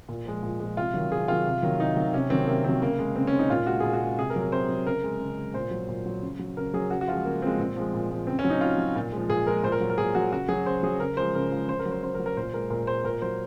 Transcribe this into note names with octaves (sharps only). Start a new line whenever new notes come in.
A#2
F3 G#3
A#2
F3 G#3
C3 F4
D#3 F#3
C3 G#4
D#3 F#3 F4
C3
D#3 F#3
C3 D#4
D#3 F#3
C3 C#4
D#3 F#3 C4
C3 A#3
D#3 F#3 C4
C#3 A#3
G#3
C#3 C4
C#4
G#3
D#4
A#2 F4
G#3 F#4
A#2 G#4
F#4
G#3
C3 G#4
A#4
F#3
A#4
C3 C5
F#3
C#3 A#4
G#3
C#3
G#3
A#2 C5
F#3
A#2
F#3
C#3
F#3
C#3 A#4
F#3 G#4
C#3 F#4
F#4
F3 G#3 F4
C#3 A#3
F3 G#3 C4
A#2 C4
F3 G#3
A#2
F3 G#3
C#3 C4
C#4
F#3
D#4
C#3 F4
F#3
A#2
F3 G#3
A#2 G#4
F3 G#3 A#4
A#2 C5
A#4
F#3
A#4
A#2 G#4
F#3 F#4
C#3 F#4
F#3 G#4
C#3 C5
F#3 G#4
C#3 A#4
F3 G#3 C5
C#3 A#4
F3 G#3
C#3 C5
A#4
F#3
C5
C#3 C5
A#4
F#3
A#4
A#2 C5
G#3 A#4
A#2 A#4
G#3 C5
A#2 A#4
F#3 C5